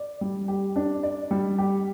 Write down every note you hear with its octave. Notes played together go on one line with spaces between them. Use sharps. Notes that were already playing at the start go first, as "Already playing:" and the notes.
Already playing: D5
G3
G4
D4
D5
G3
G4